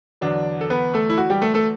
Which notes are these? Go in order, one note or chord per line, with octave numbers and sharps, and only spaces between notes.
E2 D3 F#3 D4 D5
A4
B3 B4
A3 A4
E4
F#4
G3 G4
A3 A4
A3 A4